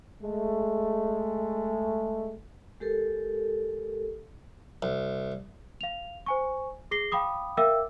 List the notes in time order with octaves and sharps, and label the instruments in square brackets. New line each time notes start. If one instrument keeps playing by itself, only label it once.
[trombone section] G#3 A3
[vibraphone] G#3 G4 A4 A#4
[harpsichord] C2
[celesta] F5 F7
C5 G#5 C#6
G#4 D6 A#6 C7 G7
F5 G5 B5 D6 D#6
A#4 E5 F5 G5 D6 E6